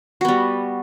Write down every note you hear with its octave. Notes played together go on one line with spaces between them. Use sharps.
G3 B3 F#4